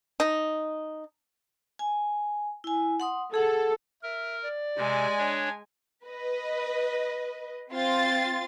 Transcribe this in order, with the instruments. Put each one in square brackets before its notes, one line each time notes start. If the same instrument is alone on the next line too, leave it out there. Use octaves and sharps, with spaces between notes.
[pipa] D#4
[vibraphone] G#5
E4 G#5
F#5 C6 D#6
[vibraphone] G#4 F#5 [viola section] A4
[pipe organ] A#4 [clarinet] E5
[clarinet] D5
[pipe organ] C3 [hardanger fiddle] G#3 G#5
[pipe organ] D4 C#5
[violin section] B4 D#5
C4 F4 C6 A6